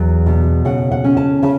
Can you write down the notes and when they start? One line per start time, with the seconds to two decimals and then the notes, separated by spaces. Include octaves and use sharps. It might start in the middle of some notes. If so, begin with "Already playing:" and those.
Already playing: E2 F#3
0.26 B2
0.65 C#3 F#5
0.91 F#5
1.04 C#4
1.17 A5
1.42 C#3 A5